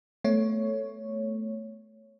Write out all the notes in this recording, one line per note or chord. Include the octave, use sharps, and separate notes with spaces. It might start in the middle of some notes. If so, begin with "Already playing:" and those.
A3 B3 C#5